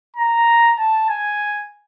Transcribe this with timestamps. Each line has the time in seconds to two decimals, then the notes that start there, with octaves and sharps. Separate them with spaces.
0.16 A#5
0.78 A5
1.10 G#5